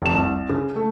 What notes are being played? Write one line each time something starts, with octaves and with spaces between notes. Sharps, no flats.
F1 E7
C2
C#3
A3